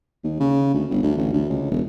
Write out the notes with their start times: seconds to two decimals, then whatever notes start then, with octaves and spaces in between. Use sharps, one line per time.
0.24 D#2
0.40 C#3
0.74 D2
0.90 G1
1.03 D2
1.17 A1
1.33 D2
1.50 C#2
1.71 E1